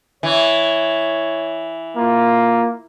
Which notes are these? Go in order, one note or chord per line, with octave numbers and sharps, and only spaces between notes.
E3 C#5
A#3 F4